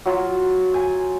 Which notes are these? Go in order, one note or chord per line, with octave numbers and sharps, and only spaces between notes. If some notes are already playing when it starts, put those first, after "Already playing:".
F#3 F4
G#5